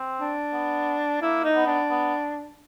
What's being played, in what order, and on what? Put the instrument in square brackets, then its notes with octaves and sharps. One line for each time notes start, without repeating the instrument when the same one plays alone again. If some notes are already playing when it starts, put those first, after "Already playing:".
Already playing: [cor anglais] C4
[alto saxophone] D4
[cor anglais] B3
[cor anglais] A#3 [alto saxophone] E4
[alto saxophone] D#4
[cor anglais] B3
[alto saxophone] D4
[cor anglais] B3